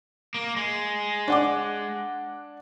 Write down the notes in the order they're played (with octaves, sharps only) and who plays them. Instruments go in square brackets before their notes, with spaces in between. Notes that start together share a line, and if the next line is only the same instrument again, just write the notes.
[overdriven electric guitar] A#3
G#3
[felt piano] D4 F#5 D6